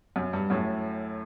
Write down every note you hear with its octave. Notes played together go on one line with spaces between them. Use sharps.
F#2
G2
F#2 A2